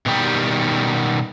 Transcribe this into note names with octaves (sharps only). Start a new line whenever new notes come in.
B2 D#3 G3 G4